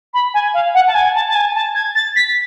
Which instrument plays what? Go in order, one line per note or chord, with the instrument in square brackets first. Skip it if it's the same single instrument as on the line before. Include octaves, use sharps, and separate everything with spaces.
[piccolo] B5
G#5
F5
F#5
A5
G#5
A5
A5
G#5
A5
G#6
A6
B6